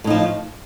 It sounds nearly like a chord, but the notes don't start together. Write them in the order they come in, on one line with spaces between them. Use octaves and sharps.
A2 D#4 F3